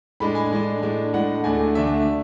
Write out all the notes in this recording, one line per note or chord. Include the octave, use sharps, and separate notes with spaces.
A2 G#3 D4 B5
G#5
A2 G#3 D4
A2 G#3 D4
A2 G#3 D4 F#5
D2 D3 A3 D4 G#5
D2 D3 A3 D4 E5